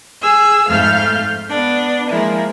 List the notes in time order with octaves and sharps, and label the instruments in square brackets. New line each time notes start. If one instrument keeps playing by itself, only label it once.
[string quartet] G#4 E6
F2 G#2 A3 F5 F6 G6
B3 D4
F3 G#3 A#3 E4